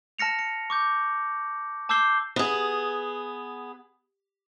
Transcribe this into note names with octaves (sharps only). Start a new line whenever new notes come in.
A5 F6 A#6 C#7 F7
C#7
C#6 D6 G6
A5 D6 E6 G6 C7 G7
B3 G#4